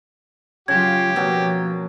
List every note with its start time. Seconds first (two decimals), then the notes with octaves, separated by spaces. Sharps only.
0.68 C#3 F#3 F4 G4 G#6
1.16 B2 F3 F#3 A#3